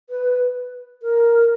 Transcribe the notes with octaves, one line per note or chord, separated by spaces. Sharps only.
B4
A#4